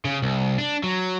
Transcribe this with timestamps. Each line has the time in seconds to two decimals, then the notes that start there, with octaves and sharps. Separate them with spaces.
0.05 C#3
0.22 C2
0.58 D4
0.83 F#3